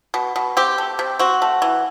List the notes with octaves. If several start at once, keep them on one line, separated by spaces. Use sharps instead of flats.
B2
B2
C4 G4
A3
C3
C4 F#4
A3
E3